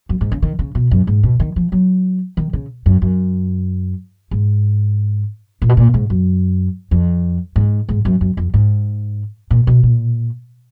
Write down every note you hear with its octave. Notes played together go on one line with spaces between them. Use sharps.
F#2
G#2
C#3
D#3
C#3
B2
F#2
G#2
B2
D#3
F3
F#3
D#3
C#3
F#2
F#2
G#2
A#2
B2
A#2
G#2
F#2
F2
G#2
G#2
F#2
F#2
F2
G#2
A#2
B2
A#2